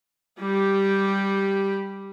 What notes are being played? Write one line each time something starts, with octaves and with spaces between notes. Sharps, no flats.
G3 G4